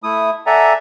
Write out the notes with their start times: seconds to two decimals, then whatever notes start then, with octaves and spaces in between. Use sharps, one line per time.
0.03 A3 E4 D#6
0.46 A4 D5 E5 F#5 G#5 A#5